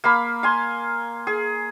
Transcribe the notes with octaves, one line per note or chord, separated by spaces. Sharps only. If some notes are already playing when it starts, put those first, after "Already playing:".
A#3 F5 B5
F5 G#5 C6
G#4